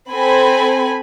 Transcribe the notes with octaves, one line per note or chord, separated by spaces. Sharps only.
C4 A4 G#5 B5